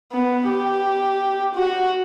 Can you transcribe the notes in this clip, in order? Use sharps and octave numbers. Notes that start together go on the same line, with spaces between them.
B3
G4
F#4